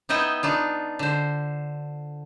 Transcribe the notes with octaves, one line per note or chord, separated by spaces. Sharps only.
B3 D#4 E4 D#5 G5
D4 D#4 F4
D3 C5